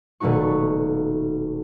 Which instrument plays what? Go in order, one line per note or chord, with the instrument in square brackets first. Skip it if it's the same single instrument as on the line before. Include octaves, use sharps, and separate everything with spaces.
[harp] D#1 B2 A3 D#4 F#4 C#6